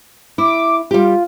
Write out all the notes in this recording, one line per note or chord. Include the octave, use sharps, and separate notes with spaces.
E4 D6
G3 F4 G4